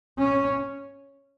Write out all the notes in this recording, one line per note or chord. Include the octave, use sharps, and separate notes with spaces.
C#4